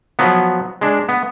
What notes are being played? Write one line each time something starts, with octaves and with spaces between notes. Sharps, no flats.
F3 F#3 B3
G#3 D4
B3